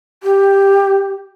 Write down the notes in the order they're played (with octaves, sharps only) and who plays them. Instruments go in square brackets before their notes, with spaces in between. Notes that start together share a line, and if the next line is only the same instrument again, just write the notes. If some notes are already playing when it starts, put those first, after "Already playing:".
[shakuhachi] G4